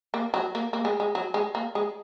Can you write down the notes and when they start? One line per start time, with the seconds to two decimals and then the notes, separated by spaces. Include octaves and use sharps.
0.14 A#3
0.34 F#3
0.55 A#3
0.73 A#3
0.85 G#3
1.00 G#3
1.15 F#3
1.34 G#3
1.55 A#3
1.75 G#3